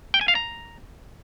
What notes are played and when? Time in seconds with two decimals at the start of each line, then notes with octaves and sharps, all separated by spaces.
0.14 G5
0.21 G#5
0.28 F5
0.35 A#5